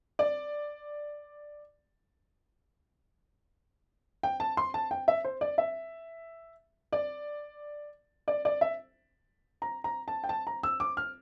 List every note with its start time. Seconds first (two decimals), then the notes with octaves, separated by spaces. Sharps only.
0.19 D5
4.23 G5
4.40 A5
4.57 C6
4.74 A5
4.91 G5
5.08 E5
5.25 C5
5.41 D5
5.58 E5
6.93 D5
8.28 D5
8.45 D5
8.61 E5
9.62 A#5
9.84 A#5
10.08 A5
10.24 G5
10.29 A5
10.47 A#5
10.63 E6
10.80 D6
10.97 F6